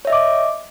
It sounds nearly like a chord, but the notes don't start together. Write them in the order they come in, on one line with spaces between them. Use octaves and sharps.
C#5 E5 D#5 D6